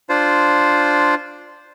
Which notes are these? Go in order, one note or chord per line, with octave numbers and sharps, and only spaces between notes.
D4 F4 C5